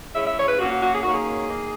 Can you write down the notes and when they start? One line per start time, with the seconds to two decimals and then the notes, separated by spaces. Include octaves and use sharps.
0.14 C#3 G#3 C#4 E4 E5
0.25 E5
0.37 C#5
0.48 B4
0.59 A#2 A#3 C#4 F#4
0.70 F#4
0.82 F#4
0.93 G#4
1.03 F#2 D#3 A#3 C#4 F#4
1.13 G#4
1.49 D#3 A#3 D#4